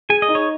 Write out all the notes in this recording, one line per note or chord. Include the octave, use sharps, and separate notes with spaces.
G#4 G#5
D#5
D#4
C#5